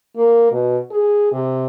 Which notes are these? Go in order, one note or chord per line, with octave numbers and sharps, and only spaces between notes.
A#3
B2
G#4
C3